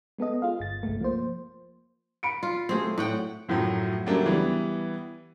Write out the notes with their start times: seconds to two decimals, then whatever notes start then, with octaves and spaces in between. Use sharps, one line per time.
0.19 G#3 B3 A4 D#5
0.42 F4 G#4 F5
0.59 G1 A6
0.83 G1 C2 G#3 A3
1.01 F3 A#3 C5
2.23 B5 C#7 D7
2.43 F4
2.69 F#3 A3 C4 G#4
2.98 A2 F#5 G5
3.48 F#2 A2 F3 F#3
4.06 C#3 F#3 G3 A3 A#3 D4
4.26 E3 G3 B3